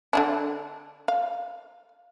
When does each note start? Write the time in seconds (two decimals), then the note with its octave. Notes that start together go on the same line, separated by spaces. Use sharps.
0.13 D3 C#4 D4
1.08 F5